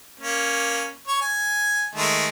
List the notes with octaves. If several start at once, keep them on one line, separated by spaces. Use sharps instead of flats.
A#3 C#4
C#5
G#5
D#3 G#3 A3